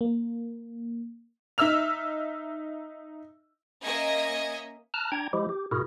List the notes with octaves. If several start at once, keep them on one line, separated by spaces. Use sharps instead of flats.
A#3
D#4 E5 E6 F6 F7
A#3 C#4 D#5 E5 G#6 A#6
A5 A#5 F6 F#6
D4 G5 A#5 G#6
F3 G#3 E4 G4
G4
G#2 B2 E4 F#4 G#4 A#4